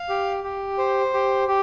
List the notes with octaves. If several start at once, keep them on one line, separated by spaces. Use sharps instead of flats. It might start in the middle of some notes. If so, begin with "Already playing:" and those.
Already playing: F5
G4
G4
C5
G4
G4